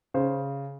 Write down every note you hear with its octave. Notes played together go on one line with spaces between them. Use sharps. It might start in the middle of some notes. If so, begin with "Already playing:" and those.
C#3 C5